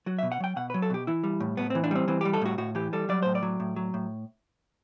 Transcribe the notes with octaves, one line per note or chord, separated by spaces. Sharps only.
F#3 F#4
E5
B2
F#5
F#3 G5
B2 F#5
B4
F#3
A4
B2 G4
E3 E4
G3
A2
A2 B3
C4
E3
D4
G3 C4
E3 C4
G4
G3
A4
A2 F#4
A2 F#4
E3 G4
G3 A4
F#3 D5
A2 C5
D5
F#3
A2
F#3
A2